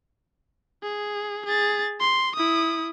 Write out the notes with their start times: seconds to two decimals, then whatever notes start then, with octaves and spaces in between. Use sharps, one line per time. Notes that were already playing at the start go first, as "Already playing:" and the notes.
0.83 G#4
1.45 G#4 A6
2.00 C6
2.35 E4 D#6